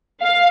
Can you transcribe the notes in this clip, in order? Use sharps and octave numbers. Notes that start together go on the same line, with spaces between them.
F5